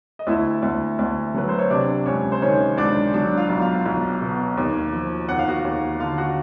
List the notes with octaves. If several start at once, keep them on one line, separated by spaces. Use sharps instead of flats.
D#5
D2 E4 E5
D2
D2
F#3 B4
C5
C#5
C3 D4 D5
C#2 C#4 C#5
C5
D#3 C#4 C#5
C#2 D4 D5
F#3 D4 D5
F4 F5
B1
F4 F5
B1
B2
D#2
F3
D#2 F#5
F5
F#4 F#5
D#2
D3 F4 F5
F#4 F#5